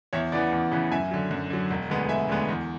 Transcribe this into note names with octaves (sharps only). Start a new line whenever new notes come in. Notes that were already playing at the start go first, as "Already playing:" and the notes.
E2 C#5 E5
C#3 E3 B3 D5 F#5
E2
C#3 E3 B3
F#2 E5 G#5
D3 F#3
F#2
D3 F#3
E1
D2 D3 G#3 B3
E1 E5 G#5
D2 D3 G#3 B3
E2